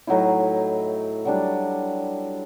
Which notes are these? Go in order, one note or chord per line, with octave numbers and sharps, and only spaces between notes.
A2 F#3 D#4 E4
F#3 G3 D4